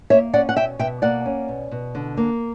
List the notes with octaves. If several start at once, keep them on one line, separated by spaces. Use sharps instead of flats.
A#3 C#5 E5
C#4 D5 F#5
F#5
B2 E5 G5
B2 E5 G5
A#3 D5 F#5
C#4
B2
B2
D3
A#3